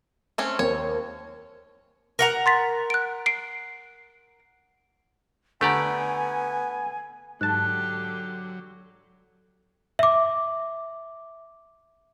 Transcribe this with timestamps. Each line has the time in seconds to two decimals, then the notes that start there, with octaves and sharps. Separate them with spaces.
0.38 A3 C4 C#4
0.59 D#2 C5 C#5
2.19 A#4 F#5 A#5
2.46 C6 A6 B6
2.90 F#6 D7
3.26 C7 D7
5.61 D3 A3 B3 G4 D5 G#5 A#5
7.41 G#2 D3 F#3 G4 A5 F#6
9.99 E5 D6